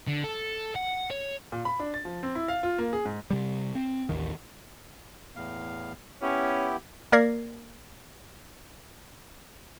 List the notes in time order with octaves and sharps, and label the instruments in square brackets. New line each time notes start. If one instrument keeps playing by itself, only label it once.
[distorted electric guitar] D3
A4
F#5
C#5
[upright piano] A#2
B5
D4
A6
F3
C4
E4
F5
F4
A#3
G#4
G#2
[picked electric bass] C3 G3
C4
A1 D#2 D#3
[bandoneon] E2 A2 F5
[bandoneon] B3 E4 G4 [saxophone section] C#4
[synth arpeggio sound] A#3 A#4 D5 G#6 A#6 C7